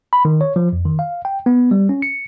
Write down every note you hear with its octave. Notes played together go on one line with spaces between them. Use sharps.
B5
D#3
C#5
F3
F2
D#3
F5
G5
B3
G3
C#4
C#7